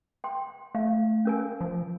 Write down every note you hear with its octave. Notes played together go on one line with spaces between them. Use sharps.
G5 C6
A3 F5
C#4 A#4 G#5
F3